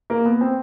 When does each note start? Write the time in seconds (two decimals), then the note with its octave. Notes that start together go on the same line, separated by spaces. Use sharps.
0.10 A#3
0.25 B3
0.41 C4